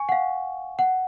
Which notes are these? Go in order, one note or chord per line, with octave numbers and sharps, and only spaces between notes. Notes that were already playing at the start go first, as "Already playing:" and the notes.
Already playing: G#5 C#6
F#5
F5
F#5